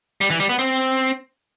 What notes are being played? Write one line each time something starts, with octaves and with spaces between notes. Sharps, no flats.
G3
E3
G3
B3
C4